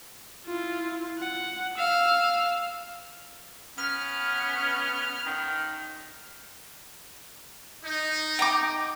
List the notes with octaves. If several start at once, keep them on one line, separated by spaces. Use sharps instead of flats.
E4 F4
F#5
F5 E6
B3 C#4 F6
D#3
D#4
G5 A#5 D6